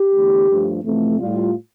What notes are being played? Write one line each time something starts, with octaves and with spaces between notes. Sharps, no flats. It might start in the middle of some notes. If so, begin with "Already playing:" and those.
Already playing: G4
E2 D3 A3
G2 F3 A3
F2 C3 E3 A3
A2 G3 F4